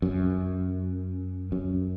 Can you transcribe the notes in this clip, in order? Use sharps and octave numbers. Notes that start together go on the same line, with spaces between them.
F#2
F#2